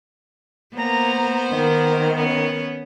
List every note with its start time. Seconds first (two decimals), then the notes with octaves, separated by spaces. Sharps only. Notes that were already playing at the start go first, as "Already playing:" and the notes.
0.75 A#3 B3 C5 A#5
1.48 D#3 A#3
2.16 B3 C#4